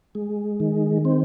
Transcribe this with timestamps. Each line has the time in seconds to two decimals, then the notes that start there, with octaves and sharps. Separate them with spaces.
0.15 G#3
0.60 D#3
1.05 C4